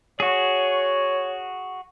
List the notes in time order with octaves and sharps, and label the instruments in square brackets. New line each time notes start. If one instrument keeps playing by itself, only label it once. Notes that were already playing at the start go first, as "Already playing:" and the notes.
[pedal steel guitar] F#4 G#4 [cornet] C#5